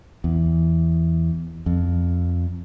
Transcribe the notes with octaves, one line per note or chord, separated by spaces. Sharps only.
E2
F2